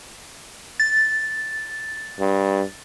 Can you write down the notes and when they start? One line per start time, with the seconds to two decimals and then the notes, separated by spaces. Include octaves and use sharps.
0.80 A6
2.20 G2